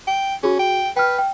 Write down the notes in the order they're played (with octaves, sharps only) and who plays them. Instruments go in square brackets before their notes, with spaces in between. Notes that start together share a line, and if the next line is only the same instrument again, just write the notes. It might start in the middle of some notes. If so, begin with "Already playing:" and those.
[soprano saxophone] G5
[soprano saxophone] C#4 [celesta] F#4 G#4
[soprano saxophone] G5
[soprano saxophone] B4 [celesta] G5 F6
[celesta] G5